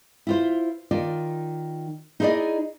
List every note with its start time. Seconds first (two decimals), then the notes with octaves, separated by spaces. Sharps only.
0.27 E4 F4 C5
0.91 D#3 F4 D5
2.20 D#4 E4 G#4 A#4 D5 D#5